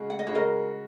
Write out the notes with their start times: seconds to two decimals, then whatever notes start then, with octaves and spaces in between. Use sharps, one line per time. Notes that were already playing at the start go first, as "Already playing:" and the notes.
Already playing: C#3 G#3 F#4
0.10 F#5
0.19 D#5
0.27 C#3 G#3 F#4 C#5
0.35 A#4 D#5